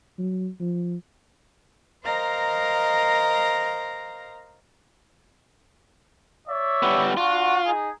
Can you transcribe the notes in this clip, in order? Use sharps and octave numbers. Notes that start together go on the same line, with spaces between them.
F#3
F3
A#4 C5 D#5 F5 A#5 A#6
C#5 D5 E5
G3 B3
D4 F4 F#4
D#4 G#4